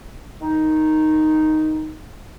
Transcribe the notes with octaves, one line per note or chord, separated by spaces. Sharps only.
D#3 D#4